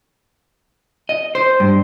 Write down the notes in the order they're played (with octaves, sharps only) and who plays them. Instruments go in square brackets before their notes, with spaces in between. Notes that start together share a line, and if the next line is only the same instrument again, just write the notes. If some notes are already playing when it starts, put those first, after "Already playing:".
[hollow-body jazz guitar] D#5
C5
G2